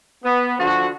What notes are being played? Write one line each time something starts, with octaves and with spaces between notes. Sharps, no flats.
B3
D3 F3 F#4